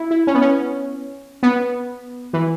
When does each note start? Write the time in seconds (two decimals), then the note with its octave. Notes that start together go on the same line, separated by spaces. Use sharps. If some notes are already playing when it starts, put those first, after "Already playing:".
Already playing: E4
0.11 E4
0.27 C#4
0.34 B3
0.41 C#4
1.43 B3
2.33 E3